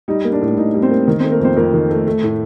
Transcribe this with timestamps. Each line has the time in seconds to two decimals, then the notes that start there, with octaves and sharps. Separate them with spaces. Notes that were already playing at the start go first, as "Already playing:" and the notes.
0.08 G3 D#4
0.25 A#3
0.33 D4
0.42 A2
0.58 A2 D#4
0.74 G3
0.82 C4 C5
0.90 A#3
1.07 D#3 A#3 A#4
1.19 C4 C5
1.23 A3
1.32 A#3 A#4
1.40 F2 C4 C5
1.57 F2 A#3 A#4
1.73 D#3
1.90 A3
2.07 A3
2.23 A2